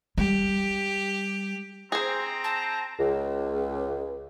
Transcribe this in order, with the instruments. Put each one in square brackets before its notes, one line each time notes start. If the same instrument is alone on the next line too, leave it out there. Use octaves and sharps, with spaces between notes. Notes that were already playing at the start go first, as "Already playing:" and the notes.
[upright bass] G3 [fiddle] G4
[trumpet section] C4 [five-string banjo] G#4 C5 [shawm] A#5
[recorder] A5
[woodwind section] C#2